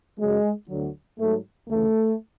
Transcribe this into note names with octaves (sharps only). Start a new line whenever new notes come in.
F#2 C#3 F#3 G#3
D2 D3 F#3
G#2 F#3 A3
D2 C#3 E3 A3